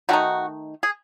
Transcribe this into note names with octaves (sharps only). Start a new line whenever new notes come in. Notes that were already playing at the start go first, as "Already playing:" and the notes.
D#3 A3 D#4 F#4
G#4